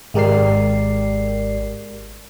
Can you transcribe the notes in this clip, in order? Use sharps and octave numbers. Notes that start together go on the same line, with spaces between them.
G#1 G#3 G4 A#4 D5 C7